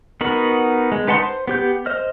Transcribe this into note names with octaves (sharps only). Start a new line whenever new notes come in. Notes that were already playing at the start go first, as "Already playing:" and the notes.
B3 D#4 F#4 A#4 B5
G#3
D#4 B4 F#5 A5 C6
C5
B3 G4 G6
C5 D#5 F6